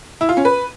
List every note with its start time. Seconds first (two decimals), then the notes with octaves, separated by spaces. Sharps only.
0.21 E4
0.29 F4
0.37 C#4
0.45 B4